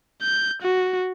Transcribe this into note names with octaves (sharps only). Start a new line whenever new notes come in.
G6
F#4